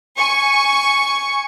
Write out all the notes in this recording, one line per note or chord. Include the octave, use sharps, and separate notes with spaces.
G#5 C#6